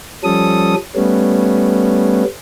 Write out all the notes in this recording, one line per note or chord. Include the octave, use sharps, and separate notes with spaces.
F3 G3 C#4 A4 D#6
G3 A3 B3 C#4